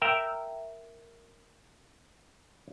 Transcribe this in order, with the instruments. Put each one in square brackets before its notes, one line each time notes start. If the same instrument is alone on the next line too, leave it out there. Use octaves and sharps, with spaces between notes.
[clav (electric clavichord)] A#4 E5 G5 A#5